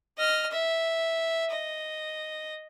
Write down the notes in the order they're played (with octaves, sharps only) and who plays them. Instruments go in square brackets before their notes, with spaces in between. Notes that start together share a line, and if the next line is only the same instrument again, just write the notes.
[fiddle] D#5 F6
E5
D#5